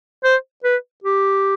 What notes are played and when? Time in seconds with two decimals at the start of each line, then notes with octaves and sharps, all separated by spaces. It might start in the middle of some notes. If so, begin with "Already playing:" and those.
0.24 C5
0.64 B4
1.04 G4